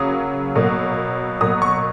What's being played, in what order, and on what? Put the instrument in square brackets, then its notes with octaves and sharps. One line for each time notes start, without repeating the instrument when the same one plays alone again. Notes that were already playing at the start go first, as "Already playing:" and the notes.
Already playing: [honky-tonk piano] C#3 F#3 A#3 D#6
B2 F#3 A#3
B2 F#3 A#3 D#6
C#6